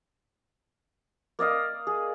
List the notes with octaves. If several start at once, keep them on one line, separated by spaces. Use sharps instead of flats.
A#3 D5 D#5 F5
G#4